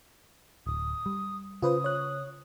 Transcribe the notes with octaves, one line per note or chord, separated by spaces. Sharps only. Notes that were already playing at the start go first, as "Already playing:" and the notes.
D1 D#6
G3
C#3 F4 B4 C5 D#6
C#5 F#6